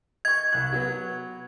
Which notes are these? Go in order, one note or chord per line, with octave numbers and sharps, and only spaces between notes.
D#5 C#6 G#6
C2 F#6
F#3 B3